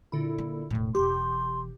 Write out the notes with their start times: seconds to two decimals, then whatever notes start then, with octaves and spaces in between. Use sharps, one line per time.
0.12 A#2 D3 E4
0.38 A#3
0.70 E1 A2
0.95 E1 E3 G4 C6